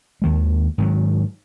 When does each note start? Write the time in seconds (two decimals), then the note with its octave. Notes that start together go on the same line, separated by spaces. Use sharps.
0.22 D#2 D#3 G#3
0.78 G#2 D#3 F#3